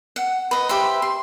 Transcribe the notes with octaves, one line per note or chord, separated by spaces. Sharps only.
F#5
B4 D#5
G4 B4 C5 E5
C6